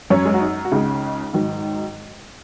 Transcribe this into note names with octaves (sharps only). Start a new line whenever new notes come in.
F#2 F#3 C#4 C#5
G#3 G#4
F#4
D#4
F#4
C#2 C#3 G#3 D#4
G#2 D#3 F#3